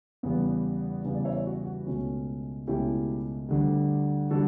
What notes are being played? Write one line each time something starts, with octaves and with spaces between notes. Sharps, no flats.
E2 C#3 G3 B3
E2 C#3 G3 B3
D5
C#5 E5
F#4
F#4
C#2 B2 A3 C#4
C#2 B2 A3 C#4 E4 G4
D2 D3 G3
D3 G3 F#4 A4